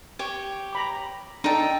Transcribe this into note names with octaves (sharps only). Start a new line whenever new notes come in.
G4 C#5
A#5 B5 D6
D4 D#4 A4 G5 A5